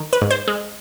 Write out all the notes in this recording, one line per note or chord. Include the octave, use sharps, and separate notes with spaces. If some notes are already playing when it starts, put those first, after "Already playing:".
Already playing: D#3
B4
G#2
C5
G#3